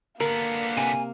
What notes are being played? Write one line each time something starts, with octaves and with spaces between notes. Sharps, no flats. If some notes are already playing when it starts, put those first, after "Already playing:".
D3 A#3 B3 A#4
C3 G#5